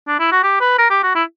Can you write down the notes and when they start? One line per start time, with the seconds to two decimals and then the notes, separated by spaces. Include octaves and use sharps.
0.08 D4
0.20 E4
0.32 F#4
0.43 G4
0.61 B4
0.78 A#4
0.90 G4
1.03 F#4
1.15 E4